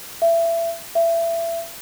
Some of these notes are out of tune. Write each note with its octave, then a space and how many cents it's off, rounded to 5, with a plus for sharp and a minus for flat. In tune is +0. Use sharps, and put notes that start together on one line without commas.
E5 +25
E5 +25